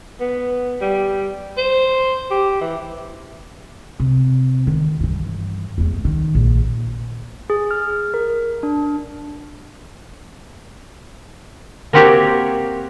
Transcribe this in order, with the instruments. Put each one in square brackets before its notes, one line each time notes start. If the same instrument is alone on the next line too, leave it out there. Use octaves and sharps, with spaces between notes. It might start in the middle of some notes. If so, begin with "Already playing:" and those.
[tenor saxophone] B3
G3
C5
G4
E3
[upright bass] C3
D#3 E3
G2 E3
E2 A3
D#3
A#1
[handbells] G#4
F6
A#4
D4
[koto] A#3 C4 F#4 G4 A#4 C#5